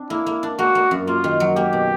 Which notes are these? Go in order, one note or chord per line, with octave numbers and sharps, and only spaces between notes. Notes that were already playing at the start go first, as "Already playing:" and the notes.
Already playing: C4 D4
A#3 E4
A#3
D4
A#3 F#4
A#3
F#2
A#3 F4
D#3
F#3
A#3 G4
B2